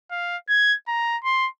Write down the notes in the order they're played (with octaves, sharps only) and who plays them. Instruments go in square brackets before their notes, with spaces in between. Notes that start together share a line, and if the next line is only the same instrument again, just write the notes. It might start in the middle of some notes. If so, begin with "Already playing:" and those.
[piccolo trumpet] F5
G#6
A#5
C6